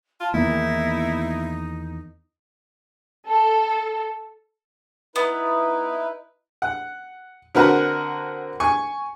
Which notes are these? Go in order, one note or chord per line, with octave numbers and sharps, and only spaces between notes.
F4 A5
E2 D#3 A#3 B3 D#4 E4
A4
B3 D#4 E4 B4
F#5
D3 C4 F#4 A#4 B4 F#5
G#5 C#6